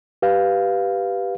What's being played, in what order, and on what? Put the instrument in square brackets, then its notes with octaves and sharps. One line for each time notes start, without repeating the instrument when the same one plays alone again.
[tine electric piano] G4 B4 F5